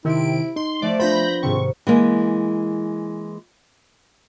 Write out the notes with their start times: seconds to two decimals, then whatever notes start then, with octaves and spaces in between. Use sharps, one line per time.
0.05 C3 D#3 E4 D7
0.56 D#4 C6
0.82 F3 A3 D5
1.00 B3 D4 F4 C5 B5 G6 A#6
1.43 G#2 C3 D#3 C4 C#6
1.87 E3 G#3 A#3